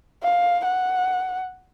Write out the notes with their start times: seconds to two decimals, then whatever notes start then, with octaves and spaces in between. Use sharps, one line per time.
0.23 F5
0.65 F#5